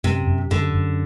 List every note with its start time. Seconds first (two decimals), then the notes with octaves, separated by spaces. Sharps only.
0.04 F#2 C3
0.27 F#2
0.51 F#2 D3
0.74 F#2